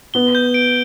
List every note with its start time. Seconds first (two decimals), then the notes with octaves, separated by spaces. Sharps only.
0.14 B3 G7
0.35 G6
0.54 D7